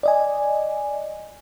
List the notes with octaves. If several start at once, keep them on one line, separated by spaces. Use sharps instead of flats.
D5 D#5 G#5